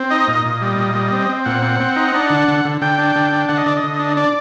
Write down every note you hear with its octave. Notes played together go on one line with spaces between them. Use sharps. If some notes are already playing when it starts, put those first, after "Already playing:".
Already playing: C4
D#4 D#5
A#2
A#2
G3
A#2
G3
C4
C4
A#2 F#5
C4
C4
D#4
D4
D3
D3
D3
D3 G5
D4
D3
D4
D3 F#5
D#5
D3 D5
D#5
D3
D4
D4 D5